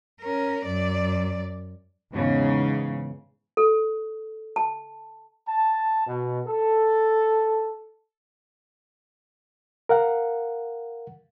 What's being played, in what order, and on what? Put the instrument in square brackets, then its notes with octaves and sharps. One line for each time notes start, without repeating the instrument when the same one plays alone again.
[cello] C#4 A#4
F#2 D5
[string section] E2 G#2 C#3
[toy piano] A4
A5
[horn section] A5
B2
A4
[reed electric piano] A#4 F5 F#5